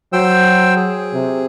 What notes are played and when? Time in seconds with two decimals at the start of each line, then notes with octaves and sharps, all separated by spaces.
0.13 F#3 C5 G5 E6
0.76 G#4
1.14 C3